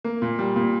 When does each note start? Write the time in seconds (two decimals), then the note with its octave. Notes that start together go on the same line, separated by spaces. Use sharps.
0.04 A#3
0.22 A#2
0.39 G3
0.56 A#2